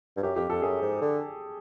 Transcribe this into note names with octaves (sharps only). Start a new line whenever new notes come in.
G2
F#2 G4
F2 G4
F2 A4
F#2 G#4
G#2
D3